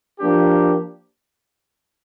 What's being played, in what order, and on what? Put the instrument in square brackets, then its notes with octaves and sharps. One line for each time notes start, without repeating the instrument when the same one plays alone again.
[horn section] F3 A#3 D4 G4